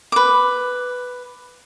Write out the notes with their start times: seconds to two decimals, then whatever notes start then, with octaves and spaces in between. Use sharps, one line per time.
0.12 B4 D6